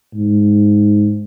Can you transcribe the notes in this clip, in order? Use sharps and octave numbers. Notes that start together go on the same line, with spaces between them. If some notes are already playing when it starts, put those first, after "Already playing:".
G#2